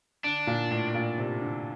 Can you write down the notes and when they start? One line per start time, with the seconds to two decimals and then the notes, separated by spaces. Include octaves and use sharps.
0.24 D3 D4
0.47 A#2
0.71 A2
0.94 A#2
1.18 C3
1.41 D3